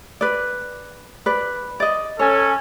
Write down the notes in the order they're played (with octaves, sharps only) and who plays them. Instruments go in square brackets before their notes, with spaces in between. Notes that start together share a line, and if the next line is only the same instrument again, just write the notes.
[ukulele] B4 D5
B4 D5
D5 D#5
[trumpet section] C#4 A4 G#5 [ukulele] C#5